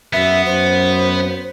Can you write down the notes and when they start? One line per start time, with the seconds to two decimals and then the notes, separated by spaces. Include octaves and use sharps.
0.13 F#2 B3 E5
0.46 F#2 C5